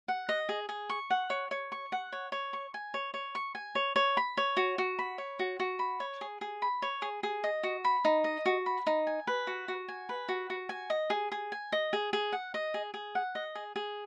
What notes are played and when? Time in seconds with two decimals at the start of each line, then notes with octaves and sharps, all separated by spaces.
0.08 F#5
0.29 D#5
0.49 G#4
0.69 G#4
0.90 C#6
1.10 F#5
1.30 C#5
1.51 C#5
1.72 C#6
1.92 F#5
2.12 C#5
2.32 C#5
2.53 C#6
2.74 G#5
2.94 C#5
3.14 C#5
3.35 C#6
3.55 G#5
3.75 C#5
3.96 C#5
4.17 B5
4.37 C#5
4.57 F#4
4.78 F#4
4.99 B5
5.18 C#5
5.39 F#4
5.60 F#4
5.79 B5
6.00 C#5
6.21 G#4
6.41 G#4
6.62 B5
6.82 C#5
7.02 G#4
7.23 G#4
7.44 D#5
7.63 F#4
7.85 B5
8.05 D#4
8.24 D#5
8.46 F#4
8.66 B5
8.87 D#4
9.07 G#5
9.27 B4
9.47 F#4
9.68 F#4
9.88 G#5
10.09 B4
10.29 F#4
10.50 F#4
10.69 G#5
10.90 D#5
11.10 G#4
11.32 G#4
11.52 G#5
11.72 D#5
11.93 G#4
12.13 G#4
12.32 F#5
12.54 D#5
12.74 G#4
12.94 G#4
13.15 F#5
13.35 D#5
13.55 G#4
13.76 G#4